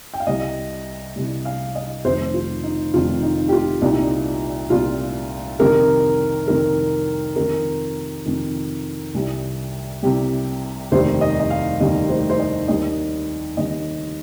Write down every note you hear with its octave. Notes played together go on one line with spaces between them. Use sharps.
G5
F5
C2 C3 G3 D#5
C2 C3 G3
F5
D#5
F1 F2 D#3 C5
F4
D#4
F1 F2 D#3 F4
D#4
G4
F4
C2 A#2 G3 D#4
C2 A#2 G3 F4
F2 C3 D#3 G3 A#4
F2 C3 D#3 G3 A#4
F2 C3 D#3 A#4
F2 C3 D#3
C2 C3 G3
C2 C3 G3 G4
F1 D#2 D#3 G3 C5
D#5
D#5
F5
F1 D#2 D#3 G3 D#5
C5
C5
D#5
D#2 D#3 G3 D#5
D#2 D#3 G3 D#5